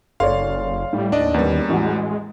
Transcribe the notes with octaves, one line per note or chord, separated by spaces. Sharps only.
F#1 A4 C#5 D5 F5 C6
A2 G3
D#2 D4 D5 D#5
E2 G3 A#3 C#4 B4
A1 G#3 F#4 F#5